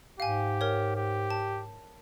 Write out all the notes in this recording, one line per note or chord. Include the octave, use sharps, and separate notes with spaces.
G#2 G4 F5 G#5
A#4 C#5
G4
A5